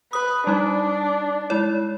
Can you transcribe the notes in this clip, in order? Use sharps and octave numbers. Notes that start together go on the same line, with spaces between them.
B4 D#6
G3 D4 D#4
G#3 E4 C#5